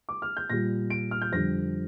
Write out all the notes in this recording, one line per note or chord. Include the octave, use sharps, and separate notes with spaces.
D6
F6
G6
A#2 G3 A#6
D7
F6
G6
F2 D3 G3 A#6